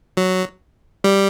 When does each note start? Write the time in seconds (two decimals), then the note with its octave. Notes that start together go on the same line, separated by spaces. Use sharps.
0.17 F#3
1.04 G3